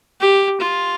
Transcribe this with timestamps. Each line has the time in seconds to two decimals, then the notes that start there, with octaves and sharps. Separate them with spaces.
0.21 G4
0.61 F4